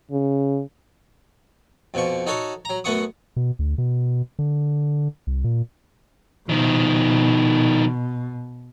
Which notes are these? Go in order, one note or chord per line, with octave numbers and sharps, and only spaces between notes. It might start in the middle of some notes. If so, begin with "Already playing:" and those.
C#3
F2 B2 F3 C#6
D#4 F#4 A4 C#5 A5
F#3 A#5
F#2 A3 B3 F#5 C#6 D#6
B2
D2
B2
D3
C2
A#2
B2 D#3 F3